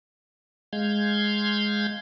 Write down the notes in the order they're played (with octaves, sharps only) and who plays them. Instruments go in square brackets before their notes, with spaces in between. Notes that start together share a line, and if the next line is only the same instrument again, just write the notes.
[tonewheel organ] G#3 F5 G6 G#6